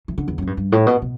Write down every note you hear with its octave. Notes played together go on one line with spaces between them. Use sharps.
E3
D3
E2
F#2 A2
G2
G2
A2
B2
B2